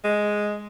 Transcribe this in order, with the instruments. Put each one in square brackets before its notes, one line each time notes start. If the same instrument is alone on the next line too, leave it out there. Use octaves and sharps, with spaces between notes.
[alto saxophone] G#3